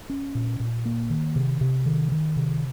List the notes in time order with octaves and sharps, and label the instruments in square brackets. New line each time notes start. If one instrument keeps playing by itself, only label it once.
[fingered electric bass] C#4
A#2
A#2
A#3
D#3
C3
C3
D#3
D#3
C3